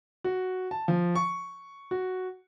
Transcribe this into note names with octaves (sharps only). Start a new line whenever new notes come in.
F#4
A5
F3
C#6
F#4